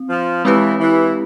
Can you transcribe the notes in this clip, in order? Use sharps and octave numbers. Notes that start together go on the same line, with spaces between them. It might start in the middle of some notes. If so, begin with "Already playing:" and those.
Already playing: C4
F3
E3 G#3 C4 E4 G4 B4
E3